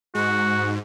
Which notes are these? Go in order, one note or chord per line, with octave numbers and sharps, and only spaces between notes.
G#2 F#4